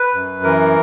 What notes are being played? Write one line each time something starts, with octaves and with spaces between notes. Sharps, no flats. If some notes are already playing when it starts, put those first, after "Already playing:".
Already playing: B4
F#2
E3 A#4